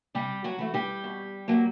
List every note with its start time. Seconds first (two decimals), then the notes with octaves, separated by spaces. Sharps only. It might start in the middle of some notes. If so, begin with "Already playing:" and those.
0.15 C3 G3 G4
0.44 F#3 F#4
0.59 E3 A3
0.74 G3 G4
1.04 B2
1.48 F#3 A#3